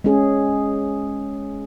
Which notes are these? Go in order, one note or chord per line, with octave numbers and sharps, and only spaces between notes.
G#3 C#4 G#4